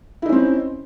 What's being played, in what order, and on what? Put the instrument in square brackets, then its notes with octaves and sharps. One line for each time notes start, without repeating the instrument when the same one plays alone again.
[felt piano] E4
D#4
C#4
C4